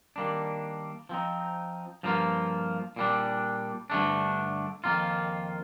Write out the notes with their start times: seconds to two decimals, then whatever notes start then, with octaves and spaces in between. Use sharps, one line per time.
0.16 D#3 G3 A#3 D4
1.09 F3 C4 D#4
2.03 G2 F3 A#3 F4
2.96 A#2 G3 D4
3.90 G2 D3 A3 D4
4.84 F2 D#3 A#3 F4